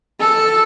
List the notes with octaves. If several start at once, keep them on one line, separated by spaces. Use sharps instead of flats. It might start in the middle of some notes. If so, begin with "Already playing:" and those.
A4